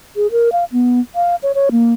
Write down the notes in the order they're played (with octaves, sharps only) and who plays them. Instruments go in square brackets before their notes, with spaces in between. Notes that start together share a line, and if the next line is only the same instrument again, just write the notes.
[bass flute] G#4
A#4
F5
B3
F5
C#5
C#5
A#3